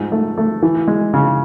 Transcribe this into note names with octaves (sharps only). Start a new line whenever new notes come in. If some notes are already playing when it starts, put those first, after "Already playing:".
Already playing: G#2 F3
A3
A3
E3
G#3
C#3